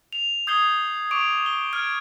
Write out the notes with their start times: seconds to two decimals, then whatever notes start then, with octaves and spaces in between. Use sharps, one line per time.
0.13 F7
0.47 D#6 G6 G#6 C7 F7 G7
1.11 C#6 D6 D7 F7
1.46 G7
1.73 F6 G#6 D7